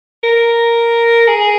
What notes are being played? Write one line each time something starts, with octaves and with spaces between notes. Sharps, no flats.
A#4
G#4